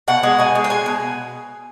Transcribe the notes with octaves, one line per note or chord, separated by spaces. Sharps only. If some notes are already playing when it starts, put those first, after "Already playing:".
B2 F#5
G#3
B2 G#5
G#3
G5
G#3 G#5
B2